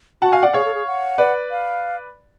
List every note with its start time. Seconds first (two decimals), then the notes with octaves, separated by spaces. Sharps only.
0.22 F#4 F#5 A5
0.32 F5 G#5
0.43 D5 F#5
0.53 G#4 C#5 F5
0.65 A4
0.75 G#4
0.87 F#5
1.18 B4 D5
1.51 F5